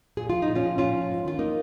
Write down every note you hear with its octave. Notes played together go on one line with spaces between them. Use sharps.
A#2 G#4
F3 F4
D#4
A#2
C#4 F4
F3
A#2 C#4 F4
F3
G#2
D#3 F4
A#3 D#4